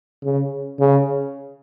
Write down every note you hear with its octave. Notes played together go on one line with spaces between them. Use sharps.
C#3
C#3